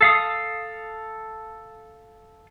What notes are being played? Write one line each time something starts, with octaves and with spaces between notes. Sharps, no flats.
A4 F5 D#6